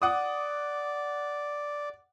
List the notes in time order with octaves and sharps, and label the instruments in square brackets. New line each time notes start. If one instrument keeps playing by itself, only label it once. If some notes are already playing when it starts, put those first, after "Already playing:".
[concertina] D5 [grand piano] F#5 D6 D#6